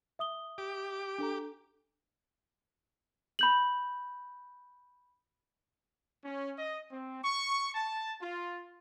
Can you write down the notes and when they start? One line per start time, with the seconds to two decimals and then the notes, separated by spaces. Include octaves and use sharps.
0.19 E5 D#6 G7
0.58 G4 D6
1.18 D4 A4 A#5
3.39 B5 G6 F#7
6.24 C#4
6.58 D#5
6.91 C4
7.23 C#6
7.74 A5
8.22 F4